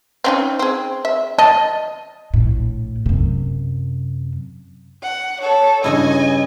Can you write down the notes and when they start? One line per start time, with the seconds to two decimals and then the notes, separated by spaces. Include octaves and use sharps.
0.24 C4 C#4 D#4
0.59 C4 G#4
1.05 E5
1.38 D#5 A5
2.34 A#1 A2
3.06 F#2 C3
5.03 F#5
5.41 A4 C#5
5.84 G2 C#3 E4 D#5 G#5